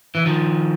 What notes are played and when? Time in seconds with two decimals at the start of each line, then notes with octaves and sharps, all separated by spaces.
0.15 E3
0.26 D#3 F3